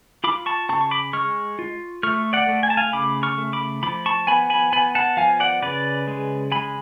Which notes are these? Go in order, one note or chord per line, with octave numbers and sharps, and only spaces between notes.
F4 B5 D6
A5 C#6
C#3 A5 C#6
C#6
B5 D6
G#3 C#6 F6
F4
A3 C#6 F6
D5 F#5
A3
G#5
A5
F5 G#5
C#3 B5 D6
C#6 F6
A3
B5 D6
F3 B5 D6
A5 C#6
B3 G#5 B5
G#5 B5
B3 G#5 B5
F#5 A5
F3 F5 G#5
D5 F#5
C#3 B4 D5
G#3
G#3 G#5 B5